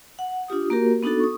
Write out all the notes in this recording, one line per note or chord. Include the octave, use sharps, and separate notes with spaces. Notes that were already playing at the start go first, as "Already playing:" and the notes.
F#5
D4 F4 G4 D#6
A#3 F#4 G4 A#4
B3 D4 D#4 F#4 A4
C#6 D#6